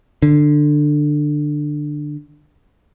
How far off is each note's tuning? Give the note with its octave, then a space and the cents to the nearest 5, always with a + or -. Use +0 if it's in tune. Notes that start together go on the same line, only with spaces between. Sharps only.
D3 +15